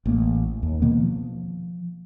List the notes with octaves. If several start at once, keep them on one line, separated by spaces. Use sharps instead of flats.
A1 A3 A#3
D#2
B2 D#3 A#3 B3
F3